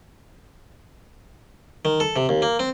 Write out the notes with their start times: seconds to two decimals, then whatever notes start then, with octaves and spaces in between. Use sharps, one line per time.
1.85 D#3
2.00 A4
2.16 C3
2.29 D#2
2.42 A#3
2.59 C4